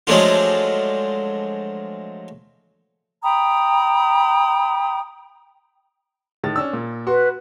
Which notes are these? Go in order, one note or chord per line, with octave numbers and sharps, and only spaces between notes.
F3 F#3 G#3 A3 D4 F4
G5 A#5 B5 D#6
A2 D#3 A6
C#4 D4 E6
A#2
F#4 B4 C6